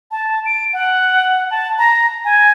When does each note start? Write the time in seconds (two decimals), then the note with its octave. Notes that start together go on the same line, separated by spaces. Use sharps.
0.11 A5
0.46 D7
0.73 F#5
1.51 A5
1.78 A#5
2.25 G#5